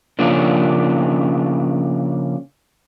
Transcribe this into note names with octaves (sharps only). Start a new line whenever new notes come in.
C#3 F3 A#3 C#4 D4